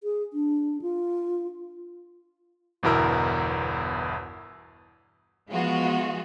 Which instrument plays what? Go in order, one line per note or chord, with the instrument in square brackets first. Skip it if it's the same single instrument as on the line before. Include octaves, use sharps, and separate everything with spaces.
[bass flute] G#4
D4
F4
[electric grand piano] G1 E2 B2 E4 A#4 E6
[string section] E3 F3 G#3 B3 F4 F#4